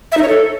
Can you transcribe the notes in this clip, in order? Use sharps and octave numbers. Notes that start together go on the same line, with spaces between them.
E5
D#4
C#5
A4